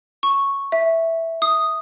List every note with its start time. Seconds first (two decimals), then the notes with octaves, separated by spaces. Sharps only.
0.23 C#6
0.72 E5
1.42 D#6